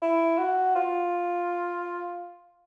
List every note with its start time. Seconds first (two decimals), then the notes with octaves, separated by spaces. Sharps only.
0.02 E4
0.38 F#4
0.75 F4